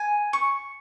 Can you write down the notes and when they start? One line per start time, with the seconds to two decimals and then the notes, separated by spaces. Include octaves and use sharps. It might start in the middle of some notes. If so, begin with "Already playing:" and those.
Already playing: G#5
0.33 C#6